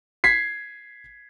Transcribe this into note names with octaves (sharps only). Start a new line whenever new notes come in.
G#6 B6 C7